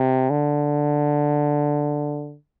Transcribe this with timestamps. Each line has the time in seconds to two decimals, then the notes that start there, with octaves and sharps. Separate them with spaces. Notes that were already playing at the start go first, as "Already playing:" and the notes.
Already playing: C3
0.30 D3